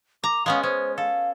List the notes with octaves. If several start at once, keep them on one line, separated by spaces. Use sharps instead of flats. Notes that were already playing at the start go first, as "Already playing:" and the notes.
A#5 D6
G#3 B3 C#4 F5
C#4 C5
A4 F5